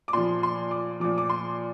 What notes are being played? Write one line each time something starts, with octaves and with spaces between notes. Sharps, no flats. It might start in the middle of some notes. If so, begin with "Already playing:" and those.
D6
A#2 F3 C6
C6
D6
A#2 F3 D6
D6
C6